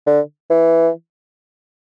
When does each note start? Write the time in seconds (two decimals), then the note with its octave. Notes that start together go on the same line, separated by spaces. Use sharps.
0.07 D3
0.50 E3